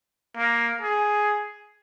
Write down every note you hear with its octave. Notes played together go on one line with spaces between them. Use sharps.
A#3
G#4